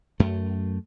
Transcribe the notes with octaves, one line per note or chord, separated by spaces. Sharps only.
F#2 A3